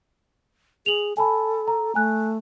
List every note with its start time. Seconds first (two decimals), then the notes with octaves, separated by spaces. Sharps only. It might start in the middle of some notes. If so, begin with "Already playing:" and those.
0.86 G#4 F7 F#7
1.17 A4 G#5 A5 B5
1.68 A#5
1.95 A3 G#5 F#6